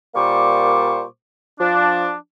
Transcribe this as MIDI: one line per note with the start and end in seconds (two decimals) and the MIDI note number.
0.15 1.03 46
0.15 1.03 55
0.15 1.03 58
0.15 1.03 72
0.15 1.03 85
0.15 1.03 86
1.60 2.12 53
1.60 2.12 62